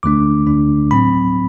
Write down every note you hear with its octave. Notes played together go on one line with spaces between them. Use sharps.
D2 D3 A3 D4 D6
D2 D3 A3 D4
A2 F#3 C4 B5